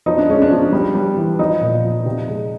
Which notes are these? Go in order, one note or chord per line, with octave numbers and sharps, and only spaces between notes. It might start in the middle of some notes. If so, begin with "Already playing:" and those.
F3 D#4
D4
G#3 C#4
D4
F3
G3
G3
E3
F3 D#4
A#2
F3
C3
G#3